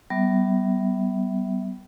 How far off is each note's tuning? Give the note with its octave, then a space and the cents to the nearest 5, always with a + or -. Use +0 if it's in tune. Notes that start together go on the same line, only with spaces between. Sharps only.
G3 -35 B3 +0 E5 -5